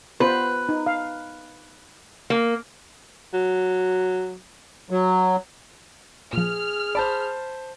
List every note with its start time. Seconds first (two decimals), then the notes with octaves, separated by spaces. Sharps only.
0.20 B3 F4 B4 C5
0.69 D#4
0.86 F5
2.30 A#3
3.33 F#3
4.90 F#3
6.33 A#2 F3 G#4 F6
6.95 C5 D5 A5 B5